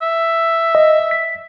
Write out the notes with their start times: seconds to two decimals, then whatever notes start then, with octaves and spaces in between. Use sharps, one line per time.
0.02 E5
0.75 D#5
1.11 B6